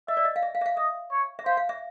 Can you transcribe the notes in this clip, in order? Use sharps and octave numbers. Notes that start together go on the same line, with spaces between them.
D#5 E5
D5
D#5
F5
E5
F5
E5
F5
D#5 E5
C#5
E5
C5 F5
F5
E5